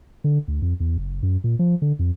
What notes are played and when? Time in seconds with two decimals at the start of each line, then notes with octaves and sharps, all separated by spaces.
0.24 D3
0.48 D2
0.62 F2
0.80 E2
0.98 F#1
1.23 F#2
1.44 A#2
1.59 F3
1.82 D3
1.99 F2